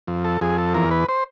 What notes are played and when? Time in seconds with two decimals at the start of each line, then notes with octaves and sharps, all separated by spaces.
0.08 F2
0.25 A4
0.41 F2 G#4
0.58 A4
0.74 E2 A#4
0.91 B4
1.09 C5